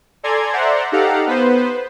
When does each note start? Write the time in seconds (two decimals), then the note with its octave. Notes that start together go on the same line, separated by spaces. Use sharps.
0.23 A4 D5 G#5 A#5 C6 G#6
0.53 C5 D5 E5 F#5 A#5 C6
0.92 D#4 G4 A4 F5 F#5 A#5
1.27 B3 B4 C5